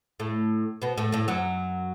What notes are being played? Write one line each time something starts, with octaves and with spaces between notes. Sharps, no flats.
A2 A3
B2 B3
A2 A3
A2 A3
F#2 F#3